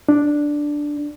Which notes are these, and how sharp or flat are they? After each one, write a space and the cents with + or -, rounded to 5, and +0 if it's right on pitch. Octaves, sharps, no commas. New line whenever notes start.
D4 +0